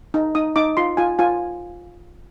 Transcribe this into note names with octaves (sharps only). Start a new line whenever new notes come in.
D#4
D#4 D#6
D#4 D6
F4 C6
F4 G#5
F4 G#5